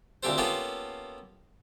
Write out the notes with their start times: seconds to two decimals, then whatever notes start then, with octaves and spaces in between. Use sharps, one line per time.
0.23 D2 A#2 C4 G4 A4 C5
0.38 A#3 B3 C#4 F4 G4 A4